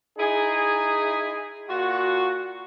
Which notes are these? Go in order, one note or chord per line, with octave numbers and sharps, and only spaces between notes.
D#4 E4 G#4
A#2 F4 F#4